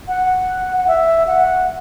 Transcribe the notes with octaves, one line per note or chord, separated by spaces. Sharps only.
F#5
F#5
E5
F#5